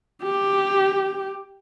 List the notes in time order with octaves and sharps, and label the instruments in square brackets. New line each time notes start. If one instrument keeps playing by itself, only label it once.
[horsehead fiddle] G4